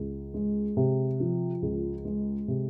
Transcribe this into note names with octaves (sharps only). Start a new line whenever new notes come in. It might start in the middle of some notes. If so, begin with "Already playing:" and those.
Already playing: C#2
G#3
C3
F3
C#2
G#3
C3